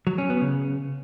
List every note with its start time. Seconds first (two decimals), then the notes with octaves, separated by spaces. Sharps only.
0.07 F#3
0.18 C#4
0.30 B3
0.41 C#3